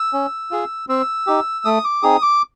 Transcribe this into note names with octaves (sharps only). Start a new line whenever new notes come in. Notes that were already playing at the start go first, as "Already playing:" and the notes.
Already playing: E6
C#4
F4 G#4
C4 E6
D#4 G4
A3 D#6
D6
C4 D#4 G#4 D#6
D6